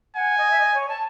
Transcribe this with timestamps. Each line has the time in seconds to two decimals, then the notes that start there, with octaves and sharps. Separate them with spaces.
0.15 F#5 G#5
0.38 D#5
0.51 E5
0.59 D#5
0.74 C#5
0.89 A5